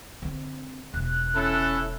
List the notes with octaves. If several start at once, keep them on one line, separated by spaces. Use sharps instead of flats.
D3 C4
E1 B3 F#6
C#4 E4 A4